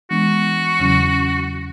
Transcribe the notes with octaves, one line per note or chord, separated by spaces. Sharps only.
E3 G#3 B3 D4 F#4
E2 C#3 F#3 C#4